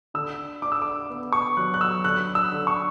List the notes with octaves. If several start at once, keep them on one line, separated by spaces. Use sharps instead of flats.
D3 E6
D4 D6
E6
D6
B3
C#6
F#3 F#6
F#6
E6
D3 F#6
E6
D3
C#6